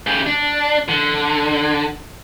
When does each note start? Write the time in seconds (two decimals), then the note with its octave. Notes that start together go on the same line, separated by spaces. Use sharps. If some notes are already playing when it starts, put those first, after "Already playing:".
0.07 C#3 G4
0.26 D4
0.89 D3